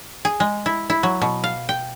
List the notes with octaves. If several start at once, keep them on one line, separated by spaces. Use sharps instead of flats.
G#4
G#3
E4
E4
F#3
B2
F5
G5